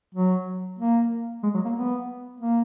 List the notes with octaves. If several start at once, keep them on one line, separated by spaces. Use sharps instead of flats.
F#3
A#3
G#3
F#3
A#3
B3
A#3